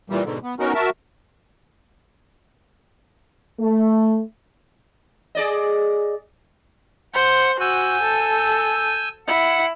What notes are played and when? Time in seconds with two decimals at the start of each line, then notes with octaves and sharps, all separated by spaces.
0.10 A#2 E3 G3
0.24 G#2 B2 D3
0.43 B3
0.60 B3 C#4 D#4 F#4 A#4
0.75 F#4 A#4 E5 A5
3.60 A3
5.35 G#4 D5 D#5
7.14 C5 F#5
7.60 F#4 G#5 E6 G6
8.02 A4
9.27 E4 F#5